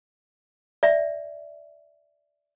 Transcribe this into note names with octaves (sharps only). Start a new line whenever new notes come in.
D5 E5